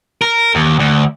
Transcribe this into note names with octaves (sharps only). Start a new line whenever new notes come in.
A#4
D#2
D2